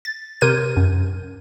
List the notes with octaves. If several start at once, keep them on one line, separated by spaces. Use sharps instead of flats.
A6
C3 A#4 G6 G#6 D#7
F#2